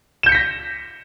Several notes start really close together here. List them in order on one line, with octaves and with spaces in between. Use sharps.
E7 G6 C#7 B6 A#6